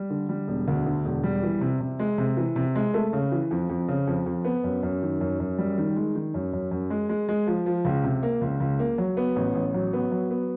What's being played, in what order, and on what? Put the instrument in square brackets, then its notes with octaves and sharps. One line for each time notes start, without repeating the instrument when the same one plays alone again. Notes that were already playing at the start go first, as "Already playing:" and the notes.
Already playing: [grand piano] G3
D3
G3
E1
D2
D3
E1
G3
E3
C3
C3
G#3
C3
E3
C3
G#3
A3
C#3
E3
F2
F2
C#3
F2
F2
B3
F#2
F#2
D#3
F#2
F#2
G3
D#3
G#3
D#3
F#2
F#2
F#2
G#3
G#3
G#3
F3
F3
C#2
C3
A#3
C#2
C#2
A#3
F#3
B3
A1
A1
F#3
B3
F#3
B3